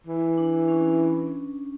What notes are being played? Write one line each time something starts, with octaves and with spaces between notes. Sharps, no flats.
E3
D4
C#4